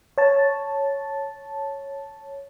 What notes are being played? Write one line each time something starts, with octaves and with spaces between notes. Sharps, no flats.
C#5 A5